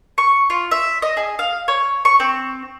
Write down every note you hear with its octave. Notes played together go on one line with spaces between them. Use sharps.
C#6
F4
E5
D#5
G#4
F5
C#5
C#6
C4